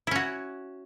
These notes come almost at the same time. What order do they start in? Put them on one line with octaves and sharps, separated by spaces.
E4 C#4 F#4